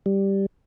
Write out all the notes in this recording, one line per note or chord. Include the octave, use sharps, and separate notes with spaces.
G3